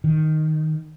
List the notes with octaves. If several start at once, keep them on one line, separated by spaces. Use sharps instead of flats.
D#3